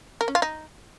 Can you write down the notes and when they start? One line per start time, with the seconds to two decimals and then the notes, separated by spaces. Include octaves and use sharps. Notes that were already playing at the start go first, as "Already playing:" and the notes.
0.21 A#4
0.28 C#4
0.35 F4
0.42 D#4